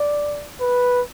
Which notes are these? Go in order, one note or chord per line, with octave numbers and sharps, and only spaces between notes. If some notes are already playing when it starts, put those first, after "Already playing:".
Already playing: D5
B4